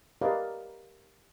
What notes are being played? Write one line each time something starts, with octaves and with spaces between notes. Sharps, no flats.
G4 A#4 B4 D5 D#5 F5